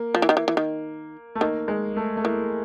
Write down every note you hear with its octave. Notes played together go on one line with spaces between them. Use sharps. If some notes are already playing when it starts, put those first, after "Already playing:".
Already playing: A#3
F3
E3
D#3
E3
E3
D#3
A3
D#3 A#3
G#3
A3
A3
E3 A#3